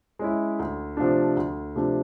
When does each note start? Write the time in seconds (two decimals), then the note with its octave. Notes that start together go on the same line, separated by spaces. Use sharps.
0.19 G#3 C#4 E4
0.59 D2
0.97 C3 F3 A3 D4
1.37 D2
1.75 C3 F3 A3 D4